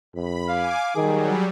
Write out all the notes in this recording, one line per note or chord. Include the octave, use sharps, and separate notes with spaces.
F2 B5
F5 G#5 D6
D#3 F#3 G3 G#4